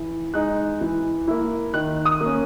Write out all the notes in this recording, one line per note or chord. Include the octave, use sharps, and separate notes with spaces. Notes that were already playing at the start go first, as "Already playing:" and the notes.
Already playing: E3
G#3 D#4 F#6
E3
A#3 E4
D#3 F#6
D#6
A#3 C#4